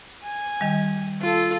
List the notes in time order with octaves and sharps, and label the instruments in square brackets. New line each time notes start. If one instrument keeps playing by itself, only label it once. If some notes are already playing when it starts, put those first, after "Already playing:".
[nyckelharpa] G#5
[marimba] D#3 G3
[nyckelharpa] F4 A4